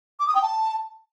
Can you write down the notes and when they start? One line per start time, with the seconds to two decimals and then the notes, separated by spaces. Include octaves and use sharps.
0.20 D6
0.27 D#6
0.35 G5
0.43 A5